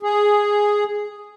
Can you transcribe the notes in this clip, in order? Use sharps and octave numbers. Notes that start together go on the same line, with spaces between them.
G#4